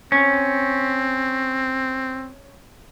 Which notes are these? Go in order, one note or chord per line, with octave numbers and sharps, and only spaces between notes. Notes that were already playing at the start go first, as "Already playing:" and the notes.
C4 C#4